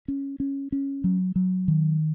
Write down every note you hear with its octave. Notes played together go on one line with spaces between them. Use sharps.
C#4
C#4
C#4
F#3
F#3
D#3